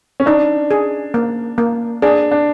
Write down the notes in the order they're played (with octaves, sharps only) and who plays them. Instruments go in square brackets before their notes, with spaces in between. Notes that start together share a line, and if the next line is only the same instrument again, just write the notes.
[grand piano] C#4
[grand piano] D4 [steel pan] D#4
[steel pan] G#4
A#3
A#3
[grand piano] D4 [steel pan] G#4
[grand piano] D4